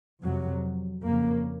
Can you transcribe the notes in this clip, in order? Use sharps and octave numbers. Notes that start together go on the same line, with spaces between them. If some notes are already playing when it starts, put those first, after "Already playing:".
F2 C3 F#3
F2 C#3 A#3